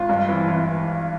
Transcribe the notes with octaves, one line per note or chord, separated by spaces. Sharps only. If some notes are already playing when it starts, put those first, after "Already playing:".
Already playing: G#1 F4
G2
E3
E3